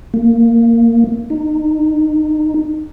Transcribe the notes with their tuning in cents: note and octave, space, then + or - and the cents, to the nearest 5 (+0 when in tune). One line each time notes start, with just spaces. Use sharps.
A#3 -10
D#4 -25